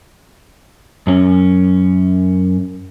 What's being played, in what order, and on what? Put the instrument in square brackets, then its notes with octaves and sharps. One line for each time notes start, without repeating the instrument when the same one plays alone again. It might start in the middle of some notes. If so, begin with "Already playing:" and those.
[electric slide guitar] F#2 C#4